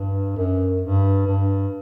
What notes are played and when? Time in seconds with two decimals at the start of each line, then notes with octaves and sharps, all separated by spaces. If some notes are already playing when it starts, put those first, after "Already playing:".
Already playing: G2
0.36 F#2
0.82 G2
1.27 G2